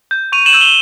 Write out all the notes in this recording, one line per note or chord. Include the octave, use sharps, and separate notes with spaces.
G6
C#6 D#7 F7
E7 F#7
E6 G6
F7 G7